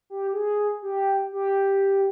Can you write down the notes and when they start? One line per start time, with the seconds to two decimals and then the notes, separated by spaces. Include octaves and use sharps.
0.10 G4
0.33 G#4
0.82 G4
1.32 G4